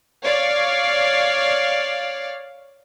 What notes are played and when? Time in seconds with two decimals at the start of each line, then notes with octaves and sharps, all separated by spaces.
0.23 C#5 D5 F5